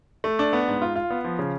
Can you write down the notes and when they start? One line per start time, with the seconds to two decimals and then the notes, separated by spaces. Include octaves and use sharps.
0.24 A3
0.39 D4
0.53 B3
0.68 G#2
0.82 F4
0.96 F4
1.10 B3
1.24 F3
1.39 C#3